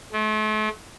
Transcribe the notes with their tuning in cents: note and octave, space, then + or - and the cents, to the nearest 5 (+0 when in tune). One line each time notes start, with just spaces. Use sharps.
A3 -40